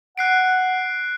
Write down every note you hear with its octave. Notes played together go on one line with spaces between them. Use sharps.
F#5 F#6 C7 D7